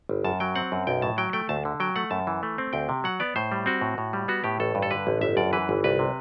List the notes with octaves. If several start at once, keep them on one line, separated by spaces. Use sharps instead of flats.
G1
F#2 A5
F#3 G5
C4 F#5
F#2
B1 G5
A2 A5
F#3 G5
A3 G5
D2 A5
D3
F#3 G5
A3 F#5
F#2 A5
E3
A3
C4
D2 G5
C3
F#3 F#5
B3 D5
A2 C5
G3
C4 F#4
A2
A2
G3
B3 F#4
A2 G4
A1 A4
G2
A4
D3 B4
A1
G1 E5
F#2 D5
E3 B4
G1
C2 B4
C3